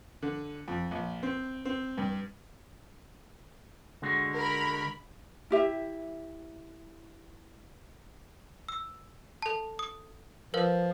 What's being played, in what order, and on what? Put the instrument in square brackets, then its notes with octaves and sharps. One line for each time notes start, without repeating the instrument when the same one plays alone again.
[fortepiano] D3
F2
A#1
C4
C4
G2
[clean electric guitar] D3 G#3 F#4
[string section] A#4 B5
[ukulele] E4 G4 E5
[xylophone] E6
A4 A5
D#6
[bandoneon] F3 [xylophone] A#4 B4 F5